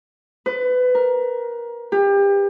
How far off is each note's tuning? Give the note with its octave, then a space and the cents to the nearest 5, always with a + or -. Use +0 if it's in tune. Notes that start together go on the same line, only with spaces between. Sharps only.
B4 +25
A#4 +20
G4 +30